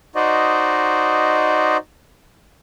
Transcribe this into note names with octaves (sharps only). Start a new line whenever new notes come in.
D#4 F#4 C5 D5 D#5